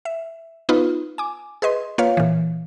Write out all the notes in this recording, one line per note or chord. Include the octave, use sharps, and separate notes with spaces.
E5
B3 D#4 F4 B4
G#5 D6
G#4 B4 D#5 C6
A#3 F4 B4 C#5 F5
A#2 E3